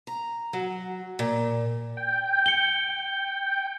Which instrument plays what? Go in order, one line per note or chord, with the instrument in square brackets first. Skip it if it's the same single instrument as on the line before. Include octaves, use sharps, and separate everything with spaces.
[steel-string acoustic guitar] A#5
F#3
A#2
[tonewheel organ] G5
[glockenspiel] C#7 G7